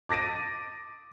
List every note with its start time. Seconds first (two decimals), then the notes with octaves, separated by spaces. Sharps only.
0.09 D6 A6 A#6 D7 D#7